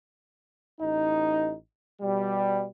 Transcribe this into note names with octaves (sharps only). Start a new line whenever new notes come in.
A1 D#4
B2 G3